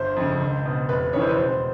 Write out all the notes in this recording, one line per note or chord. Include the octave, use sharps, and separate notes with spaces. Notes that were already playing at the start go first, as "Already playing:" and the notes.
Already playing: G1 C5
F2 C#3
C#2
B2
F1 B4
F2 C#3 E3 C#5
C5
B4
E1 C5